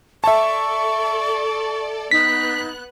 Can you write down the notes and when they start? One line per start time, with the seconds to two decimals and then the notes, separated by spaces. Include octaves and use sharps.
0.24 A4 D5 E5 A5 C#6
2.11 B3 D#4 F#6 B6